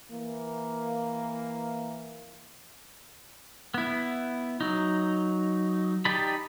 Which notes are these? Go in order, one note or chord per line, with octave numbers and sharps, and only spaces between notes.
E3 A#3
B3 E4
F#3 D#4
D#4 G4 D5 A5 B5